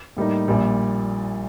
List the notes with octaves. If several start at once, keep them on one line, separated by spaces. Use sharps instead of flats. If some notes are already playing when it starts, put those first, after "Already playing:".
A2 G3 A#3 D#4
A#1 A#2 G3